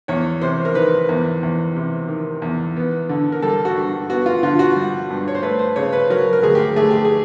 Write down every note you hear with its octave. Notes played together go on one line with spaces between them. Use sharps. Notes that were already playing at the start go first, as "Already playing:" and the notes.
E2 C#5
C3 C5
A#4
D#3 B4
E2
E2
C3
D#3
E2
B3
D3
A#4
G3 A4
F#4
G2
B3 F#4
F4
D3 F4
F#4
G3
G2
C#5
C5
A3 B4
C5
C#3 C#5
B4
F#3 A#4
A#4
D2 G#4
G4
A3 G#4
G4
G#4